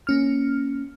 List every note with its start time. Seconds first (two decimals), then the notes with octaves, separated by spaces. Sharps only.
0.07 A#3 C#4 F6